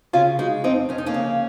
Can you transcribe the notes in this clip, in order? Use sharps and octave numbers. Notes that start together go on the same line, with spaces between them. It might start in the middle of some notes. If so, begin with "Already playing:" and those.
C#3 C#4 F4
G#3 D#4 F#4
F2 C4 D#4
F2 C#4
D#4
A#3 C#4
C#3